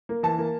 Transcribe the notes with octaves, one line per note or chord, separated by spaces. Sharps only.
A#3
E3 A5
A#3